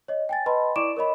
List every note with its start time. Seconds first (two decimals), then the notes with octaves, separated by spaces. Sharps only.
0.08 C#5 D#5
0.29 G5 G#5 A6
0.46 B4 D#5 A5 B5 C6
0.76 E4 D5 C#6 D6 D7 E7
0.97 A#4 C#5 D#5 B5